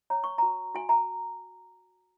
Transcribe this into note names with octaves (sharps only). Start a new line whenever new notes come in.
C#5 A#5
C#6
F#4 A#5
F#4 G#5
A#5